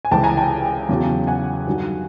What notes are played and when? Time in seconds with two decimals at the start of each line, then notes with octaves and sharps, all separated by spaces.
0.05 G#5
0.11 C#2 C3 E3 G5 A5
0.24 G#5 A#5
0.37 G5 A5
0.89 E2 C#3 F#3
1.27 F#5 G#5
1.67 G2 D#3 F#3